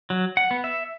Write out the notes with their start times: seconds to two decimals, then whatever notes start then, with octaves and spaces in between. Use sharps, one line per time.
0.10 F#3
0.37 F#5
0.51 B3
0.64 E5